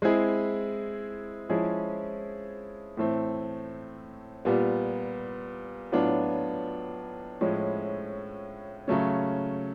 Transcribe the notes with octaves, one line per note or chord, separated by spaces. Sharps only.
G#3 C4 E4 G#4
F3 G#3 C#4 E4 G#4
A2 E3 A3 C4
A#2 G3 B3
A2 F#3 B3 D4 F4
A2 F3 G#3 C#4 E4
C#3 F#3 A3 C#4